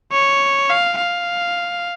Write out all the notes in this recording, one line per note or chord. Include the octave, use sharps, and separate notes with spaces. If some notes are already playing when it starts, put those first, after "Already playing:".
C#5
F5
F5